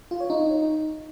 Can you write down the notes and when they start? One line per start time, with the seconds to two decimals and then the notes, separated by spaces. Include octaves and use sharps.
0.11 F4
0.20 C#5
0.30 D#4